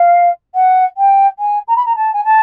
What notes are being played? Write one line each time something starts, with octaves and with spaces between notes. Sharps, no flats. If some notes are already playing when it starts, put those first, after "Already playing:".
Already playing: F5
F#5
G5
G#5
A#5
B5
A#5
A5
G#5
A5